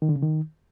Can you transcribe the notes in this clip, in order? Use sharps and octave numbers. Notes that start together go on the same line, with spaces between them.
D#3
D3
C#3
D#3